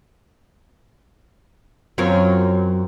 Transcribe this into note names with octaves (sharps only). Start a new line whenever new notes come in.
F#2 C4 F4 C#5